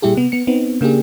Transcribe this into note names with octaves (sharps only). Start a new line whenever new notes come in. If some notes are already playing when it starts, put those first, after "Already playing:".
A#2 G3 E4 G4 G#4
C3 B3
B3 C#7
B3 C4 D#4
C#3 A#3 D4 G4 G#4